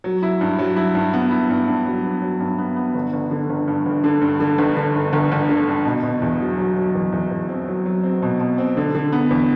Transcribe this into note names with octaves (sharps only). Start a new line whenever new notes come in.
F#3
E4
G2
F#3
E4
G2
B3
E4
G2
G2
F#3
B3
F#3
G2
B3
B3
G1
G1
D3
G1
G2
G1
D3
G2
D3
G1
D3
G1
G1
G1
D3
G2
B2
B2
E2
F#3
F#3
F#3
E2
E2
E2
C4
F#3
F#3
C4
B2
B2
C4
D3
D3
B3
E2